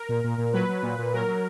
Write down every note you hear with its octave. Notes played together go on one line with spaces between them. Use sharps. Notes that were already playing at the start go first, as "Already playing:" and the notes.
Already playing: A#4
A#2
A#2
A#2
F#3 B4
F#3
A#2
A#2
F#3 A#4
F#3